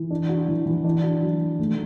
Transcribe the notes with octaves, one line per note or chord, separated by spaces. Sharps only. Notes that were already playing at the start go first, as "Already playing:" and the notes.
Already playing: E3
D4
F#4
E3
E3
D4
F#4
F#3
F#3
A3